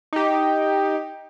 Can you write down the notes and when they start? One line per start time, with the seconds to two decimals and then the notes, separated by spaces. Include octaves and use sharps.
0.13 D#4 G4